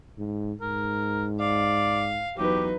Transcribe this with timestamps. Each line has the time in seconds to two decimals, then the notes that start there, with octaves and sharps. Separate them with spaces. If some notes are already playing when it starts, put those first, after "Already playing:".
0.18 G#2
0.61 G#2 A#4
1.40 D5 F5
2.38 E2 F#3 D#4 G4 B4